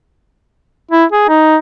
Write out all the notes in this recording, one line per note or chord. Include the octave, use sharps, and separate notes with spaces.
E4
G#4
D#4